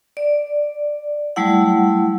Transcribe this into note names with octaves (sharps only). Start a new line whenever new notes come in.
D5
F#3 G3 A3 E4 F#5